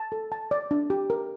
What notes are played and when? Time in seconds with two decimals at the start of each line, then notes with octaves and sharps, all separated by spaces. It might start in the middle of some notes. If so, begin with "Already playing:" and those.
Already playing: A5
0.12 A4
0.32 A5
0.51 D5
0.71 D4
0.90 G4
1.10 A#4